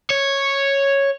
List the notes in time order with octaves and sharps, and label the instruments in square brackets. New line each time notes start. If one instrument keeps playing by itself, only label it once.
[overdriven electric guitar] C#5